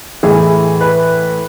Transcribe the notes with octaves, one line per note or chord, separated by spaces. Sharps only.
A2 E3 G#4
B4